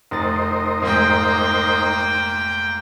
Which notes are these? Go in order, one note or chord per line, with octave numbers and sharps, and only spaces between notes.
F1 D#4 A#4 C5 A6
F1 G#2 A#3 G5 C6